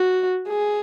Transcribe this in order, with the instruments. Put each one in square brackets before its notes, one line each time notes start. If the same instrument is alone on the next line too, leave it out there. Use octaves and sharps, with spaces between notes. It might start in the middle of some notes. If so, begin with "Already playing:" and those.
Already playing: [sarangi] F#4
G#4